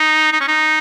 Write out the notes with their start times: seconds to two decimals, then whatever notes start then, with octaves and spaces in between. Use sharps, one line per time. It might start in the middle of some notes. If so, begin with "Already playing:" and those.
Already playing: D#4
0.33 D#4
0.41 C#4
0.48 D#4